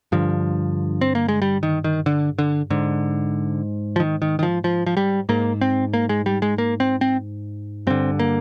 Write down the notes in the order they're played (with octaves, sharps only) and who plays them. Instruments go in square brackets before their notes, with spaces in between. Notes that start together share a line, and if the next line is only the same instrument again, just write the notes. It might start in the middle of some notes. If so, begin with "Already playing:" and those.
[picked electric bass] G2 D3 F3
C4
A#3
G#3
G3
D#3
D#3
D3
D3
G#2 D3
F3
D#3
D#3
D#3
F3
F3
F3
G3
G#2 A#3
C4
A#3
G#3
G3
G#3
A#3
C4
C4
G2 D3 C4
A#3